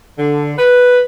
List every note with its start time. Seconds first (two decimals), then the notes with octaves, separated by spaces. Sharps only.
0.19 D3
0.59 B4